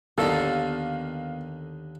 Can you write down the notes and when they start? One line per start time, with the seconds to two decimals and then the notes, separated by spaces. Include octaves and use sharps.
0.18 D#2 D3 D#3 B3 A4 F5